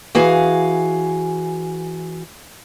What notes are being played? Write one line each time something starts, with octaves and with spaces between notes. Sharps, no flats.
E3 F#4 G#4 F5 G#5